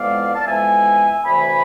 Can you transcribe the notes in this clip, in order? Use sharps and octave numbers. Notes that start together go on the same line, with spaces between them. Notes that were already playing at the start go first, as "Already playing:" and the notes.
Already playing: F2 E3 G#3 B3 D5 F5
A5
F2 E3 G#3 B3 E5 G#5
D2 C3 E3 A3 G#5 B5